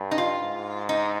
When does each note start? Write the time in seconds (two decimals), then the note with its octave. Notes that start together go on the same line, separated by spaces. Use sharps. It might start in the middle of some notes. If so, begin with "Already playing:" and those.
Already playing: G2
0.11 D#4
0.18 F4
0.41 G#2
0.89 D#4